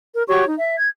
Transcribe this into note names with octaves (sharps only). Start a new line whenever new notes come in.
A#4
F#4 G4 C#5 C#6
D#4
E5
G#6